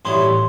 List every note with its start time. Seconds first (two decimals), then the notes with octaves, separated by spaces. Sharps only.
0.05 A1 G2 F#3 B3 E4 C6